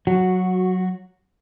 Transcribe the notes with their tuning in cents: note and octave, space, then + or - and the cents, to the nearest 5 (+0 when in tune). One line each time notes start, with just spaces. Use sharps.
F#3 +0 F#4 -15